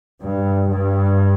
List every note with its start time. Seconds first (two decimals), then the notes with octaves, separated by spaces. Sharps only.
0.23 G2
0.71 G2